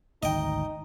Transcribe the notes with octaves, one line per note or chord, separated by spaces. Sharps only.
G#1 D2 D#4 D#5 G5